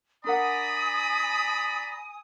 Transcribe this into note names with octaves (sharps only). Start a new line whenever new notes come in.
D4 A#4 D5 F#5 G#5 A#5 B5 D#6